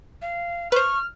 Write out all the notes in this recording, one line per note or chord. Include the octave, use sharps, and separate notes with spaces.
F5
B4 C5 C#6 F6